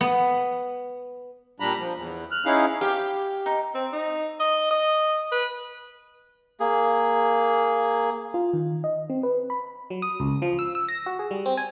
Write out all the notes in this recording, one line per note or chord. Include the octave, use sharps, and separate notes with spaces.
B3
A#2 G3 D4 A#5 B5
F3
E2
F6 F#6
C#4 D#4 E4 G#4 F5
G4 F5
D#4
C4
D#4
D#5
D#5
B4
A#3 G#4
F4
D#3
D#5
C4
B4
B5
F#3
D#6
C#2
F3
E6
E6
A#6
F#4
G#4
G3
C4
G#5